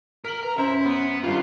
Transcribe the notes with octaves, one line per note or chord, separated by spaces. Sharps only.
A#4 B6 F#7
B4 A#5
F#2 C#4 E4 C5 A#5
B3
G#1 G2 G3 F4